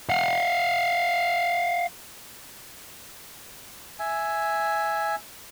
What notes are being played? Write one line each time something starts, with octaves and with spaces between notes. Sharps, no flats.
F5 F#5
E5 G#5